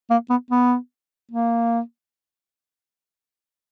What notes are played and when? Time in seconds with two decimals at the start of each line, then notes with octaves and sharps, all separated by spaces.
0.10 A#3
0.30 B3
0.51 B3
1.32 A#3